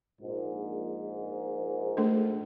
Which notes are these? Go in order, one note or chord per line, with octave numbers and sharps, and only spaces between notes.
A#1 G#2
A3 D4 A4